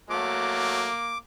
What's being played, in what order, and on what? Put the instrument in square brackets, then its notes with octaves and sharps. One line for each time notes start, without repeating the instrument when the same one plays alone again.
[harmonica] F#3 A3 [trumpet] A#3 [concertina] D6